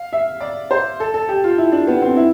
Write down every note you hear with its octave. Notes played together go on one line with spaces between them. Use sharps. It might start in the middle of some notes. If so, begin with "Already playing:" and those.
Already playing: F5
E5
D5
C5
A4
A4
G4
F4
E4
D4
B3
C4
E4